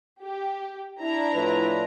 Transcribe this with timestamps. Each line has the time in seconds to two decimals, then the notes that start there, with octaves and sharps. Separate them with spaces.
0.21 G4
1.00 D4 E4 A#5
1.34 A2 F3 B4